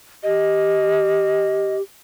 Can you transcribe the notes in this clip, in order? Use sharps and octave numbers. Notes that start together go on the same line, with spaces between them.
G4 D#5